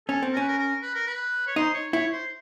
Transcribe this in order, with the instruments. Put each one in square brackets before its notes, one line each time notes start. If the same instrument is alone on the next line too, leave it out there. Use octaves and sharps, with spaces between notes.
[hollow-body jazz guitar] C#4 [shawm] A4
[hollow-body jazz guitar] C4
[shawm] A#4
[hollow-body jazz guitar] C#4 [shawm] B4
[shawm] A#4
A#4
B4
A#4
B4
C#5
[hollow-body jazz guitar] D#4 [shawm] C5
[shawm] C#5
[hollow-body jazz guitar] E4 [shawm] C#5
[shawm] C5